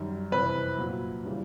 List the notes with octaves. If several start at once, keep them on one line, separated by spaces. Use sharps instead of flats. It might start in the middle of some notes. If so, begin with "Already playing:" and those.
Already playing: F#2 D#3 G3
F2 C3 E3 B4
A#2 F#3
C#3 E3 G3